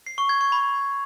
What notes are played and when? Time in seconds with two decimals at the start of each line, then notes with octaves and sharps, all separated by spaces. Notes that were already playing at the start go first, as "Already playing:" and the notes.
0.06 C7
0.18 C#6
0.29 G#6
0.41 C#6
0.52 B5